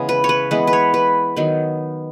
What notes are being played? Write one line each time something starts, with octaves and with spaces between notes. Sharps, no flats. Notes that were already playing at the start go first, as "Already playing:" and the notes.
Already playing: C#3 E3 G#3 B3
B4
C#5
B4
E3 G#3 B3 B4
B4
C#5
B4
D#3 F#3 B3